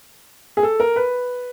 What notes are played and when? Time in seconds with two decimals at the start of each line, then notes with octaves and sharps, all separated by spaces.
0.57 G#4
0.63 A4
0.80 A#4
0.96 B4